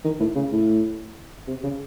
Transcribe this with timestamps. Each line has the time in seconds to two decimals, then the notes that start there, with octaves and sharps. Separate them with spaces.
0.05 D#3
0.20 A2
0.36 C#3
0.52 A2
1.48 C3
1.63 C#3